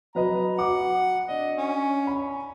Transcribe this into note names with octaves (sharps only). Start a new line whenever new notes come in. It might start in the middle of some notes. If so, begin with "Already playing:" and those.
F#3 B4 D#5 A#5
F#4 F#5 D6
D4 D#5
C#4
B5